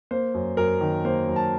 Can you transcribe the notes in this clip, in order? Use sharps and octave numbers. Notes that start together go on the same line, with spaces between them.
A#3 C5
F#2
F#2 A#4
D#3
A#3 C5
F#2
A5